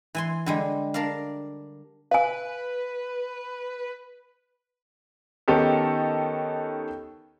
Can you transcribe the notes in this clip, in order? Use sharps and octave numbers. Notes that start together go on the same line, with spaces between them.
E3 G#5 C6
D3 G3 G#3
D4 A#4 D5 F5
B4 F5 G#5
D#3 B3 C#4 D#4 G4 A4